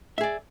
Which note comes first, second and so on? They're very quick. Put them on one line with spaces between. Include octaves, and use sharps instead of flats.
E5 G#4 D5